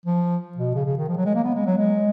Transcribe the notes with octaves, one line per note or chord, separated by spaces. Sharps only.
F3
B2
C#3
C#3
D#3
F3
F#3
G#3
A#3
B3
G#3
F#3
G#3